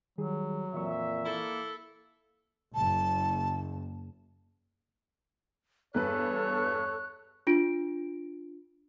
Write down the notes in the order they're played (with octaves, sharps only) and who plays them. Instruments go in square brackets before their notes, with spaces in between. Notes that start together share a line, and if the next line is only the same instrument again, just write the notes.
[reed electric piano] D#3 G3 G#4 [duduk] F#3
[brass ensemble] F2 A#2 E5 [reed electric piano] E3 C#6
[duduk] A#3 [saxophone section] E4 A4
[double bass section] F#1 [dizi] A5
[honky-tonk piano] E2 G2 B4 [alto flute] A4 [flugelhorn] C#5 [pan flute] F#6
[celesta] D4 F4 D7